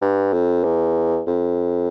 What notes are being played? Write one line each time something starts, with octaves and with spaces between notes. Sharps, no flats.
G2
F2
E2
F2